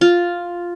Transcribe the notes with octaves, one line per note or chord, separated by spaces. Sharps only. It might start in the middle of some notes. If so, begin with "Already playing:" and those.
F4